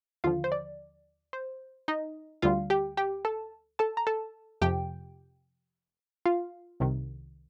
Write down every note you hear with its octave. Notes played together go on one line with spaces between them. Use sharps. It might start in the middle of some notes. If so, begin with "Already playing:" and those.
D#2 D3 F3 F4 F5
C5
D5
C5
D#4 D#5
D2 D3 G3 F4 F5
G4 G5
G4 G5
A4 A5
A4 A5
A#5
A4 A5
F2 C3 F3 G4 G5
F4 F5
C2 C3 D#3